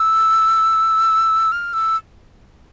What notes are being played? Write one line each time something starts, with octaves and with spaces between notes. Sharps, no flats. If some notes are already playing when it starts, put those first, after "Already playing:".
Already playing: E6
F6
E6